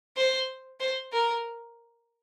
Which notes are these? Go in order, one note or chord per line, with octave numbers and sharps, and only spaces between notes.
C5
C5
A#4